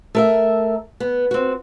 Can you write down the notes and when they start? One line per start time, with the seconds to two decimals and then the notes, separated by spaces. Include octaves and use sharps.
0.15 A3 A#4 E5
1.00 B3
1.31 C4 F#4